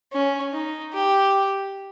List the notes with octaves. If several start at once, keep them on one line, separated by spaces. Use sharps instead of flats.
C#4
D#4
G4